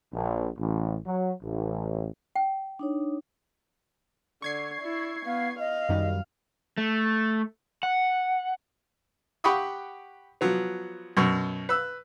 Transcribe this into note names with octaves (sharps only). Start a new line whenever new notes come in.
A#1
A1
F#3
A1
G5
D4 D#4 C#5
D3 C#6 G#6 C7
E4 D5
B3 F5
D#5 F5
F#2 D#3 G3
A3
F#5
G4 F#5 G5 B5 C#6 D#6
F3 F#3 B3
F#2 B2 C#6
B4 E6